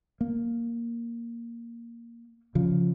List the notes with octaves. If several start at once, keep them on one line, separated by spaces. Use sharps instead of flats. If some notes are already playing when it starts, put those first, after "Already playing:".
A#3
C#3 F3